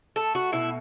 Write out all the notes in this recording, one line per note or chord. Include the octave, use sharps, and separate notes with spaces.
A3 A4
F#4
B2 E4